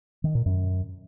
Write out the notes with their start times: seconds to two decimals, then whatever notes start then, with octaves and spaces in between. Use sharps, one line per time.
0.24 D#3
0.35 A#2
0.46 F#2